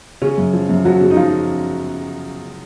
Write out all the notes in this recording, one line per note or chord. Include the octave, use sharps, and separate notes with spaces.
C#3 C#4
F#2
F3
F#2
F3 F#3 F#4
C#3
D#4
F3 F4